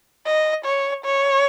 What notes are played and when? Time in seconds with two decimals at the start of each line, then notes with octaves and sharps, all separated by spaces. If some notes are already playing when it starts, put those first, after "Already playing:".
0.26 D#5
0.65 C#5
1.05 C#5